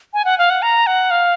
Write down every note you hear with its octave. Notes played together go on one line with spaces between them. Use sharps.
G#5
F#5
F5
F#5
A#5
F#5
F5